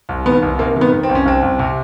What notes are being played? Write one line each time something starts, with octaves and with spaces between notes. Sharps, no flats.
C2
D#3 B3
C2
C3 A#3
D#3
B3
D#3
C4
C2
C#4
C2 C4
C2
C3